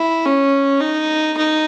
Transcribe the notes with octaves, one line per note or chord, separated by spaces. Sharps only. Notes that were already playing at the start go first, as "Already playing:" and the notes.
Already playing: E4
C#4
D#4
D#4